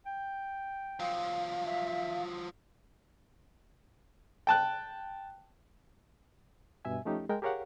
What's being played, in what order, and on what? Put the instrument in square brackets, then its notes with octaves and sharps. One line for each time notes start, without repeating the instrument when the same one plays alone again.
[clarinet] G5
[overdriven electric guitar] F3 F#3 [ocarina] F5
[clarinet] E5
[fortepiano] G5 A5 F#6
[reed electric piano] G2 B2 E5 G#5
F3 A3 C#4 D#4 G4
G#3 A#4 G5
G4 G#4 A#4 C#5 F5 F#5